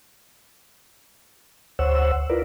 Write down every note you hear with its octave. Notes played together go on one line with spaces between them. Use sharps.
D2 C5 C#5 F#5 E6
E4 F4 A#4 B4 D5